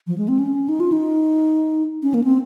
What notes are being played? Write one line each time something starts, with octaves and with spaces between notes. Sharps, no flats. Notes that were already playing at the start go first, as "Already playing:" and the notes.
F3
G#3
C4
C#4
D#4
F4
D#4
C#4
A#3
C4